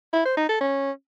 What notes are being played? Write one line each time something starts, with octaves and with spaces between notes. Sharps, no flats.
E4
C5
D#4
A4
C#4